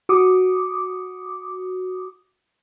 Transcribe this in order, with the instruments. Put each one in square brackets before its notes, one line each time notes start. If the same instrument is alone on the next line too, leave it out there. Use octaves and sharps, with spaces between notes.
[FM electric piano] F#4 D6 D#6